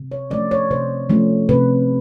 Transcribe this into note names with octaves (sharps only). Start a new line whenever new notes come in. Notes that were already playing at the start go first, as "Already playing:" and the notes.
Already playing: C3
C#5
F3 A3 C#4 D5
C#5
C3 C5
F3 A3 C#4
C3 B4